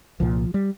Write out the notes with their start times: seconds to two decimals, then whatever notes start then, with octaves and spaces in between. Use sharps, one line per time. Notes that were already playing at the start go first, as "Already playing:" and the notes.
0.20 C2 A#2 F3
0.54 G3